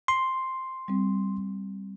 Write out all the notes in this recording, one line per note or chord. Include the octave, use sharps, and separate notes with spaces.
C6
G3 C4